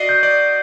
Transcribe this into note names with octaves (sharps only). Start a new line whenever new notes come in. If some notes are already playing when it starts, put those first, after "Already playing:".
Already playing: F#4 D5 D#5 C7
G6
D5